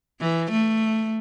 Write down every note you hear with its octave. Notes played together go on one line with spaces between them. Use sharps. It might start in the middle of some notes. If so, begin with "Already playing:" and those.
E3
A3